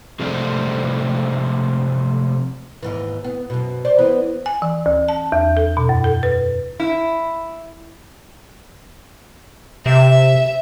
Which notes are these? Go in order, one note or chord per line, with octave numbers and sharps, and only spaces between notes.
C3 F3 G#3 A3 C4 D4
D#2 G#2 E3
B3
F#2 B2
C5 D5
E2 E3 B3
G#5
E3
D2
A5
E2
A4
B2
F#2
A4
B4
E4
C3 E5